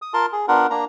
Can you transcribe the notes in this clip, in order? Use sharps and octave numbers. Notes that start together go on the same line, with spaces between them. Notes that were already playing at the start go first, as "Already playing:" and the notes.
D#6
F4 A#4 A5 C6
G#4
B3 D4 F4 A#4 F#5
A#3 D4 A#5